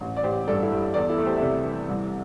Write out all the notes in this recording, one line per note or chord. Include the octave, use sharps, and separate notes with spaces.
A1
D5
A1 G4 C5
G2 A4 D5
E4 A4
G3
E2 A4 D5
E4 A4
A3
G4 C5
E5
C3 A4 D5
E3
C2